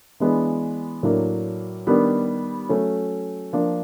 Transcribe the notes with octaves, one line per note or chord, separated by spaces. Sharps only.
E3 G#3 B3 D4
A2 F#3 A#3 D4
D#3 G3 B3 D4
F#3 A3 C#4
F3 A#3 D4